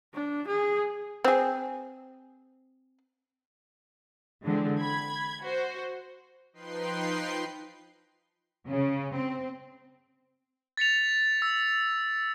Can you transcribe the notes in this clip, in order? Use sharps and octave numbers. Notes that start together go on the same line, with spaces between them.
D4
G#4
C4 G#4
D3 E3 G#3 C4
B5 G#6
F#4 C5
F3 D#4 B4 G5 C6 C7
C#3
C4
A6 B6 C#7 F7
E6